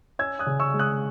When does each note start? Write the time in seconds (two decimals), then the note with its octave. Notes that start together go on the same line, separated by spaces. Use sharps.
0.19 C#4 E6 G#6
0.39 D#6 F#6
0.46 C#3
0.60 C#6 E6
0.74 G#3
0.79 D#6 F#6